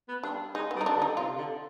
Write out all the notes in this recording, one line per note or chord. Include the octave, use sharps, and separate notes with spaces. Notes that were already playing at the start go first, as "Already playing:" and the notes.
B3
G3 D4
G#3 D#4
G3 B3
D#4
D4
D3
D#4
C3 F4
D3